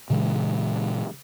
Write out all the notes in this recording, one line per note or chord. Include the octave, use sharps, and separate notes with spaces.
A#2 C#3 E3 G#3